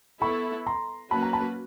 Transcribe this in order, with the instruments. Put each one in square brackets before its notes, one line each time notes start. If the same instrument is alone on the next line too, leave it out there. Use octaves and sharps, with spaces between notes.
[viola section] B3 E4 A4 [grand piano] B5 C#6
[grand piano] A#5 C6
[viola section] F#3 A#3 C#4 F#4 B4 [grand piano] A5 B5
[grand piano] A#5
A5 B5